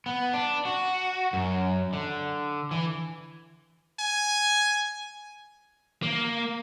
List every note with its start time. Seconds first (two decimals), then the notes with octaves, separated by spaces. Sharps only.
0.06 B3
0.33 D4
0.65 F#4
1.33 F#2
1.93 D3
2.71 E3
3.99 G#5
6.03 A#3